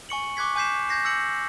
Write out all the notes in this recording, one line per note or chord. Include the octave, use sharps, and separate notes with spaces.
G#5 C#6 C#7 F#7
C#6 D6 F#6 G#6 B6
G#5 D6 G6 B6 C7 E7
G6 G#6 A#6 C7
E6 G6 A#6 C#7 F#7